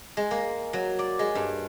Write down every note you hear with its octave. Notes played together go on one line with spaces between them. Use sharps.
G#3
A#3
F#3
D5
G#3
G2